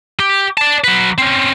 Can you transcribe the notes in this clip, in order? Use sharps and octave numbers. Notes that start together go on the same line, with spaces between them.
G4
D5 A5
F#3 B4
C4 C#4